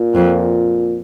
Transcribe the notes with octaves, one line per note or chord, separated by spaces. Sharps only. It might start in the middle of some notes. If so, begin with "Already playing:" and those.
Already playing: A#2
F2